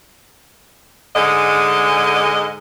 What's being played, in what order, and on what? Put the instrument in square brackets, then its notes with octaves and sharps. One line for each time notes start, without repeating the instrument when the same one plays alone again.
[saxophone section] G#2 D3 G#3 D#5